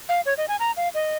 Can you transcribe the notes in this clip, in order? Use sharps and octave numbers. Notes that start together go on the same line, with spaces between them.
F5
C#5
D#5
G#5
A#5
F5
D#5